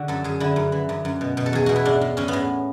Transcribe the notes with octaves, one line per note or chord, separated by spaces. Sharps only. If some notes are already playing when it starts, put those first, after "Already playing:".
Already playing: D3 F#4
F#2 A4
F#2 G#4
D3 E4
F#2
E3
F#2
F#2
B2
B2
A4
E2 G#4
B2 F#4
E4
A2 D4
A2
A2 C#4
A2 B3